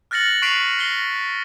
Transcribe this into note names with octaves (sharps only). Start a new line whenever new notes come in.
F6 F#6 A6 A#6 C#7 F#7
C#6 F#6 B6 C7 D7 F7
A#6 C7 G7